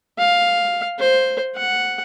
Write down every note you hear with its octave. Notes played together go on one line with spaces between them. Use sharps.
F5
C5
F#5